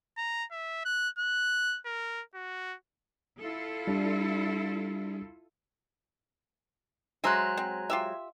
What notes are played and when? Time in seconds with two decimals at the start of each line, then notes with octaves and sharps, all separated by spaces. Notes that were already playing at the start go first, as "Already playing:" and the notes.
0.17 A#5
0.51 E5
0.85 F#6
1.19 F#6
1.86 A#4
2.35 F#4
3.39 E4 F4 A4
3.87 G3 D4
7.24 F#3 G#3 C5 E5 G#5 A#5 F#6
7.57 C4
7.90 F4 G4 E5